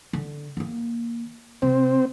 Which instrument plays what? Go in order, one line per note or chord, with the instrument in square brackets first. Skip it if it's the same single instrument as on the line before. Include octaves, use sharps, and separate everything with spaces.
[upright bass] D3
D#3 A#3
[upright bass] C3 [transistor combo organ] C4